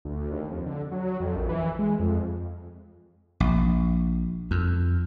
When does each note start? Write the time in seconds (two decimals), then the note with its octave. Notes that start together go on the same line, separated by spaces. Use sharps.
0.05 D2
0.31 D#2
0.51 F2
0.66 D3
0.92 F#3
1.20 F2
1.36 A#1
1.49 E3
1.79 G#3
1.99 F2
3.40 A#1
4.51 F2